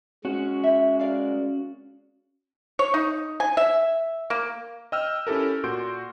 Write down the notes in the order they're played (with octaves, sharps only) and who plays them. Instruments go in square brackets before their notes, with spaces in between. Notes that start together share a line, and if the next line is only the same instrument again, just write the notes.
[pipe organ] G#3 [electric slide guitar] C#4 F#4
[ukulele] E5
A#4 D5 F5
[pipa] C#5
D#4
G#5
E5
A#3
[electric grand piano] D#5 G5 E6 F6
C#4 E4 G4 A4 A#4
A#2 F#4 C6 G6 D7